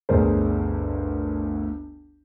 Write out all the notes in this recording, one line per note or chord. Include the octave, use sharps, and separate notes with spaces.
G1 D2 D4 G#4 A#4 C5